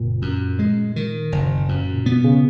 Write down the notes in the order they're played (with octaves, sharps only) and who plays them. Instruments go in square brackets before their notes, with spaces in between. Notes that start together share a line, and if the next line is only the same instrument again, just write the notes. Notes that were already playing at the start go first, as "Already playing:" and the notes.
Already playing: [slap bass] F#1 [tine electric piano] A#2
[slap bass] F#2
G#3
D#3
F#1
F#2
[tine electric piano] A#2
[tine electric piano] B2 [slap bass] B3
[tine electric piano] C#3